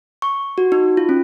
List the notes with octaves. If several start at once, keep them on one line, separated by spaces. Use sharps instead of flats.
C#6
F#4
D#4
F4
C#4